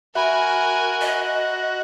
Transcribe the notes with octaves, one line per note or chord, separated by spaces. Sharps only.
F#4 A#4 E5 G#5 B5
D#5